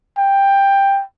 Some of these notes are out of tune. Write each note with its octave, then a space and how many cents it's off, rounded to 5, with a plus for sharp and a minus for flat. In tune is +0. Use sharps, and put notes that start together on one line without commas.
G5 +10